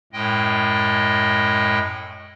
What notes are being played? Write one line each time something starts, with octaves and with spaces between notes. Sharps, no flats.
F#2 A2 G#3 D#5 G5